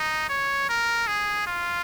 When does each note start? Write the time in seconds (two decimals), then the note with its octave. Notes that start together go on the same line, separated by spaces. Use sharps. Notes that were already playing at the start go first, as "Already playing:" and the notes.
Already playing: D#4
0.29 C#5
0.69 A#4
1.07 G#4
1.47 F4